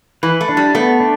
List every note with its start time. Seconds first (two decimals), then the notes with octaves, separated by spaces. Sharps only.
0.23 E3 B4
0.41 A3
0.49 D4
0.57 G3
0.75 A3 B3
1.00 D4